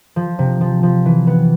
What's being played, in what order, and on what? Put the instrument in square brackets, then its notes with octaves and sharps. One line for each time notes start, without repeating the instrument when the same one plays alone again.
[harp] F3
C3
F3
F3
E3
B3